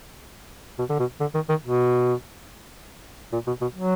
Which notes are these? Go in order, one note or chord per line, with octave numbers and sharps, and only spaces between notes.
B2
D3
B2
D3
D#3
D#3
B2
A#2
B2
B2
F#3